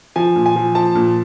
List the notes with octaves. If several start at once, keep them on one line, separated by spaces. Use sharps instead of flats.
F3 G#5
A#2
G#5
F3
F3 A5
A#2